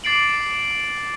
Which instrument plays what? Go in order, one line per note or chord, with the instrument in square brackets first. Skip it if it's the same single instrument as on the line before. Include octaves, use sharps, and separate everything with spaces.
[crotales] D6 A6 C7 D7 F#7